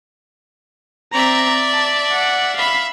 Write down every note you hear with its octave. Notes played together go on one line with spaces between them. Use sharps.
C4 D5 E5 A#5
A5
F#5
E5 F5 B5